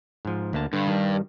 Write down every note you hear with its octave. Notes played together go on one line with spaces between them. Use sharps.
G#2 F3
D2 A#3 A5
G2 D3
D#3 G3